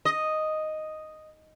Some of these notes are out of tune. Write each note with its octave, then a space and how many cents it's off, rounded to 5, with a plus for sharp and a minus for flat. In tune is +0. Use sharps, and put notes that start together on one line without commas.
D#5 +0